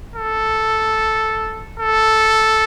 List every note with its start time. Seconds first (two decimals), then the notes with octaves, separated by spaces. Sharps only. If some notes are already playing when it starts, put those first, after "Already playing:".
0.16 A4
1.80 A4